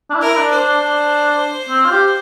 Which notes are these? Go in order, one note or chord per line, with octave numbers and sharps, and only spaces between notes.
D4
E4
A#4
E4
D4
C5
D4
D4
C4
F4
G4